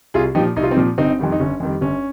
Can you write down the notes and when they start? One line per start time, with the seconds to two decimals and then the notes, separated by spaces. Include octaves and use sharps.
0.14 C2 F4 G#4
0.35 A#2 F3 D#4 G4
0.56 C2 D#4
0.63 F4
0.71 C4 D#4
0.77 A#2 F3
0.98 G1 C4 D#4
1.19 F2 D#3 G3
1.32 D#4
1.40 G1 C#4
1.60 F2 D#3 G3
1.81 G1 C#4